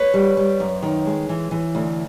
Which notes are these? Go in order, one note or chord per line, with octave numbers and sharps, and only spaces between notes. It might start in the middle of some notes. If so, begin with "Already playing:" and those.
Already playing: B4 C#5
G3
G3
F#2
D#3
G#3
E3
E3
D2